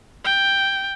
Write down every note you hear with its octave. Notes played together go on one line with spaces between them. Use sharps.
G5